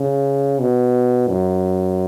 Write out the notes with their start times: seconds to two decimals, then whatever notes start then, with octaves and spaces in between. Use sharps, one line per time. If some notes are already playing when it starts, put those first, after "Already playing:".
Already playing: C#3
0.59 B2
1.28 F#2